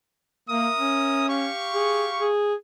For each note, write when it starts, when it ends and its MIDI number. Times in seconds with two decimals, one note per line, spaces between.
0.49 0.68 58
0.49 1.28 70
0.49 1.28 76
0.49 1.28 87
0.77 1.48 61
1.29 2.30 67
1.29 2.30 77
1.29 2.30 85
1.74 2.07 68
2.19 2.54 68